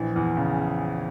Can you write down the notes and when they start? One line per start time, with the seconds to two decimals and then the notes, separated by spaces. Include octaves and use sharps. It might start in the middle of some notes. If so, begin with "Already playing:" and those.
Already playing: A#1 E3
0.16 E2
0.37 C#3